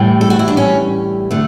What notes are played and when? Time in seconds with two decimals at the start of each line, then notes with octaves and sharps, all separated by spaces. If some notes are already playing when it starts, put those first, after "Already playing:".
Already playing: A2 E3 G3
0.21 A4
0.30 F#4
0.39 E4
0.48 D4
0.57 C#4
1.31 D3 A3